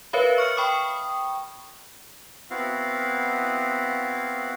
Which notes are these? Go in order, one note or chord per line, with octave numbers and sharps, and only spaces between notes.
A#4 B4 C#5 E5 F5 B5
C#6 F6 C#7
G5 B5 C#6 D#6
B3 C4 E4 F#4 F5